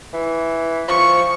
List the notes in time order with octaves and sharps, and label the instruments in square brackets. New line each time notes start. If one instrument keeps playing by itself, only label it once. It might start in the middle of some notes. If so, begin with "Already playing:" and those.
[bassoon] E3
[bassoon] F3 [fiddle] C#6